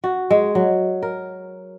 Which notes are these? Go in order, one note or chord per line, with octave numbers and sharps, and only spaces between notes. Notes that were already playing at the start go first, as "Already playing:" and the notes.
F#4
G#3
F#3
A#4